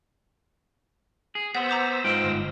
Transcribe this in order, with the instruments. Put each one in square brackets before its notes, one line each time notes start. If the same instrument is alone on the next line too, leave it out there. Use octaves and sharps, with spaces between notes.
[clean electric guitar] G#4
[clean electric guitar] B3 [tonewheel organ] C5 E6 A#6 [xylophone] F#5
[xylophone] A#5 D6 G6
[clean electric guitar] G#2 F4 G5
[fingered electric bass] G1